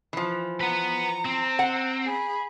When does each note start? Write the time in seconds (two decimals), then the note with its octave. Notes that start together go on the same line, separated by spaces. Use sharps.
0.13 E3 F3
0.61 B4 F#5 A#5
1.25 C4
1.59 F#5
2.04 G#4 B5